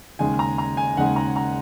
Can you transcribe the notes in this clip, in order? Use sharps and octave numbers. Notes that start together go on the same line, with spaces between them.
D#2 C#3 G#3 G#5
A#5
A#5
G#5
D#2 C#3 G#3 F#5
A#5
A#5